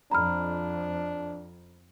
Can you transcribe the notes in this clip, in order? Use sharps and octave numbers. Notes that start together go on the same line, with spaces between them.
F2 D4 A#5 B5 F6